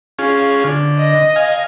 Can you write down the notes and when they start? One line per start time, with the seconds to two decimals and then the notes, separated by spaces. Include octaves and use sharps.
0.19 C#4 F4 G#4
0.65 D3
0.99 D#5
1.36 F5 G#5